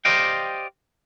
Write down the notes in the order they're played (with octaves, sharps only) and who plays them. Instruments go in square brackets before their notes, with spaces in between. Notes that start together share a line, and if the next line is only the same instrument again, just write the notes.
[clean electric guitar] G4 C5 D5 D#5 F5 G5